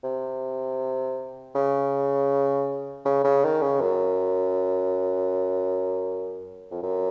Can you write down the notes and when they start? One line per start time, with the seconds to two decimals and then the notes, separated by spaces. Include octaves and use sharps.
0.04 C3
1.55 C#3
3.05 C#3
3.24 C#3
3.44 D#3
3.62 C#3
3.81 F#2
6.71 F2
6.83 F#2